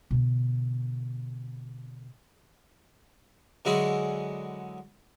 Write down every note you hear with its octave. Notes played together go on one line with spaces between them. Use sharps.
B2 D3
D3 F#3 G#3 E4 F#4 G#4